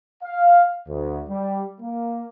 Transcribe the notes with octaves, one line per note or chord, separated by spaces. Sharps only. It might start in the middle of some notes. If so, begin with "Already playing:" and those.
F5
D2
G3
A#3